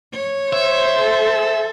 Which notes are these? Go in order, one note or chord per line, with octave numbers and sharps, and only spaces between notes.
C#5
C5 E5
A4